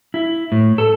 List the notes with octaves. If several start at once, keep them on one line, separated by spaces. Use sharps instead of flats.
E4
A2
A4